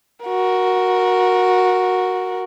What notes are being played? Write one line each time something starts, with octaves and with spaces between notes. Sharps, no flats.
F#4 A#4